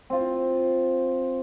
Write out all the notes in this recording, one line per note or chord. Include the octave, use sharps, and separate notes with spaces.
C4 F4